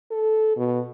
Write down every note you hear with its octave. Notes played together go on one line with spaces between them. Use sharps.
A4
B2